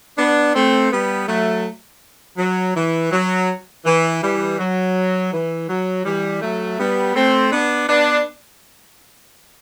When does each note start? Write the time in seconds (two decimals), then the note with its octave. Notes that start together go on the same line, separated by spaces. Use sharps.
0.17 B3 D4
0.55 A3 C4
0.91 G3 B3
1.28 F#3 A3
2.38 F#3
2.75 E3
3.11 F#3
3.85 E3
4.22 E3 G3
4.59 F#3
5.32 E3
5.69 F#3
6.05 E3 G3
6.41 F#3 A3
6.78 G3 B3
7.15 A3 C4
7.52 B3 D4
7.88 B3 D4